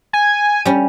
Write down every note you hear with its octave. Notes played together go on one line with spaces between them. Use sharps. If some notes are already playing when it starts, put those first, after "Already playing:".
G#5
G3 C#4